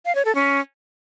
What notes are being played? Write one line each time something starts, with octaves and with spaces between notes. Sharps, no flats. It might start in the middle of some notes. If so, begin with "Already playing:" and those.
F5
C#5
A4
C#4